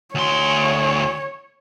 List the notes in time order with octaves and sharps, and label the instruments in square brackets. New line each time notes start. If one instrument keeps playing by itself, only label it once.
[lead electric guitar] D2 C6 [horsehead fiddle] C#5